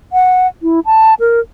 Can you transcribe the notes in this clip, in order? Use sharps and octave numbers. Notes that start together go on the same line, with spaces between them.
F#5
E4
A5
A#4